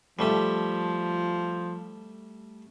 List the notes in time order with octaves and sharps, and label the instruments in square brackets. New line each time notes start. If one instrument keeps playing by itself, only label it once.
[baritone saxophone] F3 [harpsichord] G3 A3 G4